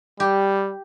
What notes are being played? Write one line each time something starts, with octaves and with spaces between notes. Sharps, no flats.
G3 G4